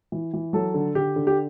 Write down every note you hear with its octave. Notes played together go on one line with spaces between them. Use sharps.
E3
E3
F#3 A4
D3
D3 G4
D3
G4